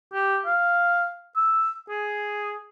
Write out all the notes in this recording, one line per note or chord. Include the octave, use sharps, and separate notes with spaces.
G4
F5
E6
G#4